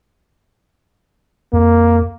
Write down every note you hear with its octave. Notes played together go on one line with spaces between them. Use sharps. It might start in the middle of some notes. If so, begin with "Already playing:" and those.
F2 A#3